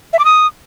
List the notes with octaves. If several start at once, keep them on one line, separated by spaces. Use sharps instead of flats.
E5
D6
D#6